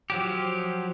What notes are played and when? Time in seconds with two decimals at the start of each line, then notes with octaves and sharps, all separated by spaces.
0.10 F3 F#3 G4